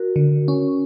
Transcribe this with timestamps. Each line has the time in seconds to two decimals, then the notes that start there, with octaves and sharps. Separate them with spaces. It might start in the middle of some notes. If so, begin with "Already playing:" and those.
Already playing: F#4 A#4
0.16 D3
0.48 C#4